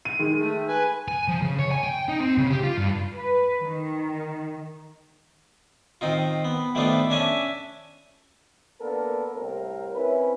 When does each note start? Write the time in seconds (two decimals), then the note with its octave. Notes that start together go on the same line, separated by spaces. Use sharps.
0.05 D#7
0.19 D#3 G#3
0.38 A3
0.68 B4 G#5
1.08 G#5
1.28 F3
1.42 C#3
1.59 C#5
1.71 G#5
1.84 G5
2.09 D#4
2.21 C4
2.38 C#3
2.51 G4
2.63 F4
2.77 G2
3.16 B4
3.62 D#3
6.01 D#3 C4 D#4 F4
6.44 B3
6.75 D#3 F3 A3 B3 D4 F4
7.10 C#4 D4 E5 G#5
8.81 A#3 B3 D4 A4 A#4
9.33 C2 A2 C4 A#4
9.94 C4 C#4 E4 B4